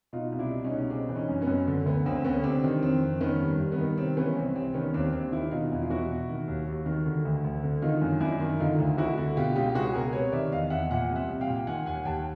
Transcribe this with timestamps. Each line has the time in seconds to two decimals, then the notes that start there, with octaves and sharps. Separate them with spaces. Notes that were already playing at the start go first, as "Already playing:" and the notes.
0.13 B2 D#4 F4
0.32 C2
0.39 D4 E4
0.51 C2
0.64 C#4 D#4
0.71 B2
0.90 C#3 C4 D4
1.09 E3
1.15 C#4 D#4
1.29 F#2
1.41 B3 C#4
1.47 F#2
1.68 D3
1.86 D2 B3
2.06 D2 C4
2.24 D3 B3 C#4
2.44 C3 C4 D4
2.64 D#3
2.82 F2 C4
3.02 F2
3.21 D#3 B3 C#4
3.40 G2
3.60 G2
3.72 B3
3.78 D#3
3.97 C3 C4
4.17 E3 B3 C#4
4.36 C2 C4
4.55 C2 C4
4.74 D#3 B3 C#4
4.94 D#2 C4 D4
5.13 D#2 C4 D4
5.32 D#3 D4 E4
5.51 B2 D#4 F4
5.72 E2 E4
5.82 F4
5.90 E2 E4 F#4
6.09 B2
6.29 D#3
6.48 D#2
6.67 D#2
6.86 D#3
7.06 D3
7.25 D2
7.44 D2
7.64 D3
7.82 D#3 D#4 F4
8.02 F#2
8.20 F#2 D4 E4
8.40 D#3
8.60 D3 D#4 F4
8.79 D2
8.97 D2 E4 F#4
9.17 D3
9.37 B2 F4 G4
9.56 C#2 F4 G4
9.74 C#2 F#4 G#4
9.93 B2 G#4 A#4
10.13 C3 B4 C#5
10.32 D#3 D5 E5
10.51 E2 D#5 F5
10.70 E2 E5 F#5
10.90 A#2 E5 F#5
11.09 C2
11.16 E5 F#5
11.28 C2
11.41 F5 G5
11.47 A#2
11.67 D#3 F#5 G#5
11.86 D#2 F#5 G#5
12.05 D#2 G5 A5